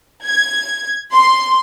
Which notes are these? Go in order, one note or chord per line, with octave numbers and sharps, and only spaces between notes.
G#6
C6